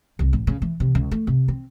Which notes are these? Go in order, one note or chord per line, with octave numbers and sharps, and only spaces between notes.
C2
A1
C#3
E3
C3
C#2
A3
C3
C4